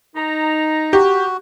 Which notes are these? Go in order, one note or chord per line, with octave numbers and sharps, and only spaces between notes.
D#4 A#5
F#4 G4